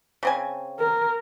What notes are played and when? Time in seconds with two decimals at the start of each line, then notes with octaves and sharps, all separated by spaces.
0.23 C#3 C4 G#5
0.79 A#4